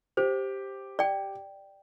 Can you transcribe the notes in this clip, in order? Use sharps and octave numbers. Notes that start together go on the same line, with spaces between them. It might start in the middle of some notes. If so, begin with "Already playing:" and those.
G4 C5
D5 G5